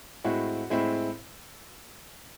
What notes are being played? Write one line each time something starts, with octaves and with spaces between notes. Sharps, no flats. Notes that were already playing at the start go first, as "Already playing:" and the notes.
A2 G#3 C4 E4 F#4
A2 G#3 C4 E4